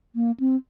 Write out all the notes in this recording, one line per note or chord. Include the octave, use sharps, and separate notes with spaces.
A#3
C4